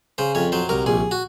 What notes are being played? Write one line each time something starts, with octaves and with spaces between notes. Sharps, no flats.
C#3 C5
F2 C#5
F#3 C5
C2 A#4
A#1 G#4
F#4